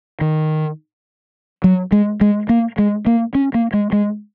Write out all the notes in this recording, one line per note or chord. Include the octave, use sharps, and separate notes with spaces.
D#3
F#3
G#3
G#3
A#3
G#3
A#3
C#4
A#3
G#3
G#3